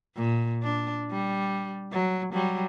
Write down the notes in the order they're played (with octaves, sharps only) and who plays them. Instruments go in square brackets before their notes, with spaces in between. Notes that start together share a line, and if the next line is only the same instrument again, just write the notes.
[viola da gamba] A#2
D4
G3
F#3
F#3 G3